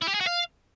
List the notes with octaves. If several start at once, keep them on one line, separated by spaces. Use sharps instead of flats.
E4
G4
G#4
F#4
F5